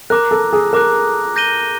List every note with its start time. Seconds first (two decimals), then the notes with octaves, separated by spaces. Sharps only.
0.10 A#4 A#5 D6 F#6
0.31 A4
0.53 G#4
0.73 A#4 A#5 D6 F#6
1.36 G6 A#6 D#7 G7